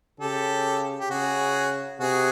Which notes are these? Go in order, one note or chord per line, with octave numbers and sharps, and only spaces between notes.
C#3 G4 A4
G4
C#3 F#4 G#4
C3 F#4 G#4